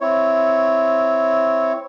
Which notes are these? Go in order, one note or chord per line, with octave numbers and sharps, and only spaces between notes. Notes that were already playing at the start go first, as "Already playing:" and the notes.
C4 E4 C#5